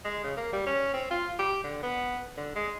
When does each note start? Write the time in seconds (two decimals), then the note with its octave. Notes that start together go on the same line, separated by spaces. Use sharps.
0.05 G#3
0.24 C#3
0.37 A#3
0.53 G3
0.66 C#4
0.94 C4
1.11 F4
1.39 G4
1.63 D3
1.83 B3
2.37 D3
2.55 G#3